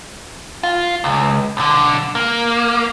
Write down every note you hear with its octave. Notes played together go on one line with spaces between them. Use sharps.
F4
C#2
B1 D3
A#3